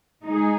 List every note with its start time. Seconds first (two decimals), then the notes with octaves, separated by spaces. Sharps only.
0.25 G#3 D#4 G#4